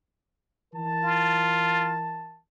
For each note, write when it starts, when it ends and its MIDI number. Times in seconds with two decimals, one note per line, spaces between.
0.74 2.38 52
0.74 2.38 70
0.74 2.38 81
1.04 1.96 65